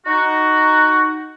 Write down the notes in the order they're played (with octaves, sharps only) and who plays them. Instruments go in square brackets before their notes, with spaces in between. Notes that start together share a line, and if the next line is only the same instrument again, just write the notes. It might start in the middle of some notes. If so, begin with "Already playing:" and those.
[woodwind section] D#4 F#4